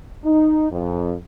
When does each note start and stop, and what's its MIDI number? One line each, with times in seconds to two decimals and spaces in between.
0.24 0.67 63
0.71 1.14 41